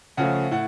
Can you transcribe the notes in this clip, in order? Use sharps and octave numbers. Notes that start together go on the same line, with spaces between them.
C#3 F3 A3 F#5
A2 F#5